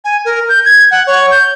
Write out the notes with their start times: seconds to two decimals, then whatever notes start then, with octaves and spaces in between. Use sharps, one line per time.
0.05 G#5
0.25 A#4
0.49 G6
0.66 G#6
0.91 F#5
1.07 C#5
1.31 G6